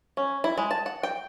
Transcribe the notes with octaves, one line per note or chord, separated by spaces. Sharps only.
C#4
E4
G#3
A5
F#5
G5